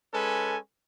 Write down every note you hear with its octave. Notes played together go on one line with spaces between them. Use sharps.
G#3 C#4 A4 B4 G#5